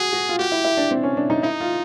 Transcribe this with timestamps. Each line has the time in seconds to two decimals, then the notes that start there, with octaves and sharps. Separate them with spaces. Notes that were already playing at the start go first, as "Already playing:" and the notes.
Already playing: F#4 G#4
0.13 F#4
0.29 F4
0.39 F#4 G4
0.52 E4
0.64 E4
0.77 D4
0.91 C4
1.03 C#4
1.17 D4
1.30 D#4
1.43 D#4 E4
1.61 F4